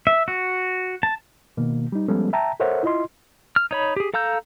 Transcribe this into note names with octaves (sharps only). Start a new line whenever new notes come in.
E5
F#4
A5
B2 D#3 A#3
G3 D#4
F3 G3 G#3 B3 C#4 A4
E5 G5 A5 A#5
A4 A#4 C5 C#5 E5 F#5
E4 F4 D#5 C6
F6
D#4 C#5 B5
G4 G#4
A4 F5 A#5 E6 G6